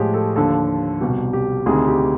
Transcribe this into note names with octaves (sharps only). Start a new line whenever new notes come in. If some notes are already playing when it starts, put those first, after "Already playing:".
Already playing: A2 F3 G#3 G4 G#4
A4
D#2 D3 F3 A4
C2 B2 G3 G4
G4
D2 C3 D#3 G#4
G4